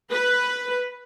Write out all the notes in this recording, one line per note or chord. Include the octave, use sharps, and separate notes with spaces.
B4